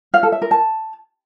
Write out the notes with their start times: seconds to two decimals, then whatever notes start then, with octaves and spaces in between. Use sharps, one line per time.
0.14 F5
0.23 A4
0.32 E5
0.42 A#4
0.51 A5